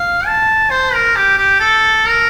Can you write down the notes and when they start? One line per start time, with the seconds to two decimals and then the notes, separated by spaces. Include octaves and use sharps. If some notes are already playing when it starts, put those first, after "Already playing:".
Already playing: F5
0.26 A5
0.70 C5
0.93 A#4
1.16 G4
1.37 G4
1.60 A4
2.05 A#4